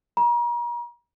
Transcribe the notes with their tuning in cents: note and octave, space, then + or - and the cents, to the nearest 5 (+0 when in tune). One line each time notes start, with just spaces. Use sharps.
A#5 +40